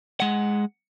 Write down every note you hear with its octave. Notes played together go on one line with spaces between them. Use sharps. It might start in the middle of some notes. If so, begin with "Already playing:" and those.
G#3 F#5